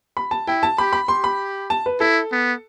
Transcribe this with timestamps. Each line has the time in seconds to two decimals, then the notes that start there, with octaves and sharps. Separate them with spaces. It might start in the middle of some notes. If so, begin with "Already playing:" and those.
0.17 B5
0.31 A5
0.47 E4 G5
0.63 A5
0.78 G4 B5
0.93 B5
1.08 G4 C6
1.24 B5
1.70 A5
1.86 B4
2.00 E4 A4
2.32 B3